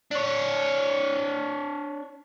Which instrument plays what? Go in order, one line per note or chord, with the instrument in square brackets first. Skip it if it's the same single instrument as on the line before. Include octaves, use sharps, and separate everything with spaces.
[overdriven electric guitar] D4 C#5